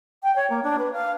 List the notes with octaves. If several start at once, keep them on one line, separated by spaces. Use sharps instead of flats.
G5
C#5
A#3
D4
B4
F5